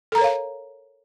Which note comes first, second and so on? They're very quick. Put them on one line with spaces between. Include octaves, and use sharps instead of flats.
A4 A#5 A#4 C#5 F5